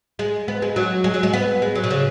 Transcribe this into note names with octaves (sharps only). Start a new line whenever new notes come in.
G#3
B3
G#3
F#3
G#3
F#3
G#3
B3
G#3
F#3
B2
C#3